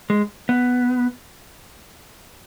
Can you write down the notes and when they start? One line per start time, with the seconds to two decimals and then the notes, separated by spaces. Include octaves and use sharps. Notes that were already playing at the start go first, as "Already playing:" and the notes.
0.10 G#3
0.49 B3